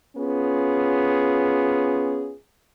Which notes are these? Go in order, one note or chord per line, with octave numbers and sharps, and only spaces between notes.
B3 C#4 F4 G#4